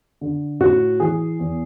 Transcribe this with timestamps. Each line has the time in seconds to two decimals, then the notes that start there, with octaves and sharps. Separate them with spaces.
0.21 D3
0.60 A2 F#4
1.00 E3 G#4
1.39 E2